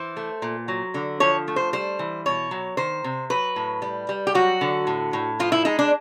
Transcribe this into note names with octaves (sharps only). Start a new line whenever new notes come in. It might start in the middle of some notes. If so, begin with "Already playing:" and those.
Already playing: E3 C5
A3
A#2
F#3
D3
F3 C#5
A3
C5
G3 C5
E3
B2 C#5
F#3
D#3 C5
C3
F#3 B4
A2
G3
G3
G4
F#3 F#4
D3
A2
A2
F3 F4
E4
G#3 D#4
D4